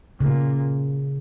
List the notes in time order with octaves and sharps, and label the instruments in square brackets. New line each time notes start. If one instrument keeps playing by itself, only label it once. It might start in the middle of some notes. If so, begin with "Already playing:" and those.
[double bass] A#2 [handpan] C#3